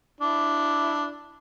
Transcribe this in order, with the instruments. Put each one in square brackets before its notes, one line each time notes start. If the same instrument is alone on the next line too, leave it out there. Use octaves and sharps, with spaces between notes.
[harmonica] D4 E4